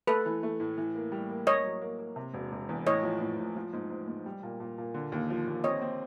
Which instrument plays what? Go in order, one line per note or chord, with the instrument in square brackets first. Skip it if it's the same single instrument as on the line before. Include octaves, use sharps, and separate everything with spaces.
[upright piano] A3 [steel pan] A4 B4
[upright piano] E3
A3
A2
E3
A#3
G3
A#3
[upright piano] A#3 [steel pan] C#5 D#5
[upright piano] F#3
A#3
A#3
C3
E1
E1
E2
[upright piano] A2 [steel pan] C#5 D#5
[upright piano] F3
A2
A2
F3
G#2
G#2
G#2
G3
A#2
A#2
A#2
D3
D#2
F3
D#2
[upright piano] C4 [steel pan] C#5 D#5
[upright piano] C4